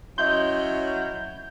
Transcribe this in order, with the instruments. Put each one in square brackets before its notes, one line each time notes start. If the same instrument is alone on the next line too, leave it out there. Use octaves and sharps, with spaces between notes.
[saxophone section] F#3 C#4 E4 [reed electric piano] D#5 E5 C6 [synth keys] G6